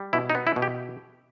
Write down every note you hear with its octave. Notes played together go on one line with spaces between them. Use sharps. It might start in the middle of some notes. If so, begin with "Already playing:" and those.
Already playing: G3
B2 E4
D#4
B3
E4
B2
G4